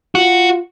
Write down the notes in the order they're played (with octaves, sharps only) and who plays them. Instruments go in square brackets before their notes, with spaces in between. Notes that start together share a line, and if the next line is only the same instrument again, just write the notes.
[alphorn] F4 [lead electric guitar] F#4